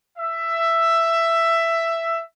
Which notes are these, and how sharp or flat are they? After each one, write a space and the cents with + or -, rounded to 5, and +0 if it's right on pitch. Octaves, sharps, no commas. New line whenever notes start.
E5 +10